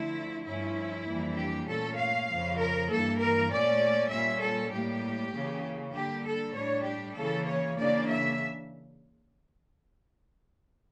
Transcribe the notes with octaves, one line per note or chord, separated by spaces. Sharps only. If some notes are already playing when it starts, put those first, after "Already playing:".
Already playing: D3 F3 A3 E4
G2 F3 A3 C#4 E4
F2 E3 G3 A#3 D4
G4
A#2 A3 C#4 A4
F5
F2 C#3 F3
A#4
G2 E3 A#3 A4
A#4
A#2 A3 C#4 D5
A#2 G3 C#4 E5
A4
A2 G3 A#3 G4
C#3 E3 A#3
D3 G3 A#3 G4
A4
A2 G3 D4 C#5
G4
C#3 E3 A#3 A4
C#5
C#3 E3 A#3 D4 D5
E5